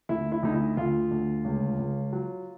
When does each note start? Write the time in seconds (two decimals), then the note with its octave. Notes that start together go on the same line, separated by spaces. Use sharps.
0.09 D2 E4
0.32 E4
0.43 D2 D#4
0.54 E4
0.77 D2 F4
1.11 D2
1.45 C#2
1.79 C#2
2.13 F#3